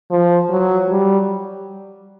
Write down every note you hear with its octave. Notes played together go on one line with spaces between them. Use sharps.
F3
F#3
G3